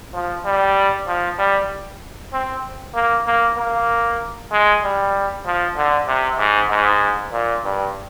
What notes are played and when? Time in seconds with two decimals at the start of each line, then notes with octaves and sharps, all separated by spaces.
0.14 F3
0.45 G3
1.07 F3
1.38 G3
2.33 C4
2.94 A#3
3.26 A#3
3.57 A#3
4.52 G#3
4.83 G3
5.45 F3
5.76 D3
6.07 C3
6.38 G#2
6.69 G#2
7.32 A#2
7.64 G2